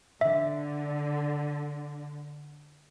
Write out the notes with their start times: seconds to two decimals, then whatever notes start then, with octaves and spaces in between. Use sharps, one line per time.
0.21 D3 E5